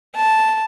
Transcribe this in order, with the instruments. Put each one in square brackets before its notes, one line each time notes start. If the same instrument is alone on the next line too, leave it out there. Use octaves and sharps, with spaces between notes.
[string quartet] A5